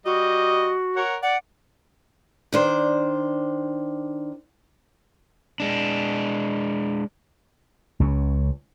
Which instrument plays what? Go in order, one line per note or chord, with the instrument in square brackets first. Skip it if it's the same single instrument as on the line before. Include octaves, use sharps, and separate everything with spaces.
[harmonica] G3 D#5 [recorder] F#4
[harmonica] A#4 C#5 F#5
[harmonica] D5 [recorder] F#5
[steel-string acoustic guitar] D#3 D4 C5
[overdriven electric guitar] G#3 D4
[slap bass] C#2 C#3